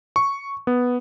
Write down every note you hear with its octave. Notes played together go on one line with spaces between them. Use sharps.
C#6
B3